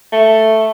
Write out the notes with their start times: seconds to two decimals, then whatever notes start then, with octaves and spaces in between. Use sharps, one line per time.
0.13 A3